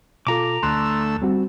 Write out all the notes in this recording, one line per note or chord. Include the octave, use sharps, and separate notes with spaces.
B2 F4 A4 A#5 D6
D2 A3 C6 E6 F#6
G3 C4 F#4